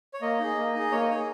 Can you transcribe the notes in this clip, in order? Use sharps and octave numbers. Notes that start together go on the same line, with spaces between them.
C#5
A#3 D#5
D#4 G#4
A#3
D#4 G#4
A#3 C#5
D#5
D#4 G#4 C#5